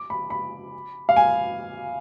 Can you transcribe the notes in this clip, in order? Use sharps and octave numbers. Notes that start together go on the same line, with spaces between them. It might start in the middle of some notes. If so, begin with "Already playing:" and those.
Already playing: D6
B5
B5
F5
G#5